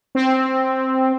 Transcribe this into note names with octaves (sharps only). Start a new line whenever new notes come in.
C4